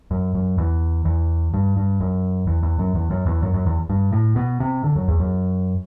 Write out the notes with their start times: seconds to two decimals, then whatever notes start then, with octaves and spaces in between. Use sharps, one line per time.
0.11 F#2
0.35 F#2
0.58 E2
1.05 E2
1.54 G2
1.77 G2
2.00 F#2
2.47 E2
2.63 E2
2.79 F#2
2.95 E2
3.10 F#2
3.26 E2
3.42 F#2
3.54 F#2
3.66 E2
3.90 G2
4.12 A2
4.36 B2
4.60 C3
4.84 D3
4.96 F#2
5.08 E2
5.20 F#2